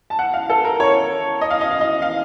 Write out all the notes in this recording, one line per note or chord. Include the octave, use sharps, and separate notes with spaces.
A5
F#5
F5
A4
A#4
C#5
D#5
F5
D#5
F5
D#5
F5